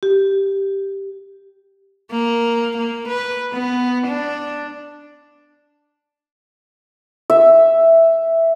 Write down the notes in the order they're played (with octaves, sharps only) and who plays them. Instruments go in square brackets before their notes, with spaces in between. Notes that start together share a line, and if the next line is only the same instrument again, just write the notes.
[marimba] G4
[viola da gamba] A#3
A#3
B4
B3
D4
[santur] E5